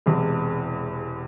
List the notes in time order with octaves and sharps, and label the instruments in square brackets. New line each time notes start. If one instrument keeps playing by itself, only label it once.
[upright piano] E1 E2 C3 G#3